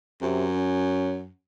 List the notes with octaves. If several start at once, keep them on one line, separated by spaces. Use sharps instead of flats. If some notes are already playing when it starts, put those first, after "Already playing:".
F#2 C3
C#4